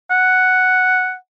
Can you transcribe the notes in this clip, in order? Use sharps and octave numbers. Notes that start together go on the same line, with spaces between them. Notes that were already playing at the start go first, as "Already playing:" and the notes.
F#5